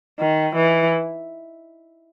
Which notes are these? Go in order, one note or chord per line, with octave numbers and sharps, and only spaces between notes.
D#3
E3